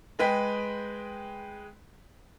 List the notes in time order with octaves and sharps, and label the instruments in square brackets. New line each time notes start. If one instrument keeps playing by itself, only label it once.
[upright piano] G#3 G#4 B4 D#5 G5 B6